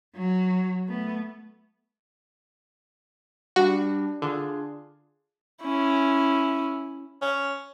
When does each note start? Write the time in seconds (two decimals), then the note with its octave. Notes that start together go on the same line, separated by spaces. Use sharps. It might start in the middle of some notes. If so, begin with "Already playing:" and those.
0.16 F#3
0.87 A3 B3
3.56 G3 D4 F#4
4.22 D3 D4 F4 G#4
5.63 C#4 E4
7.22 C#4